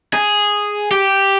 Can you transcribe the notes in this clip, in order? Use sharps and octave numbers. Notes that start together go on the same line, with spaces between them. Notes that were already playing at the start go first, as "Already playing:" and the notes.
G#4
G4